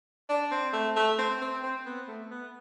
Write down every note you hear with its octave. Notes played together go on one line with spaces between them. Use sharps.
D4
C4
A3
A3
C4
C4
C4
B3
A3
B3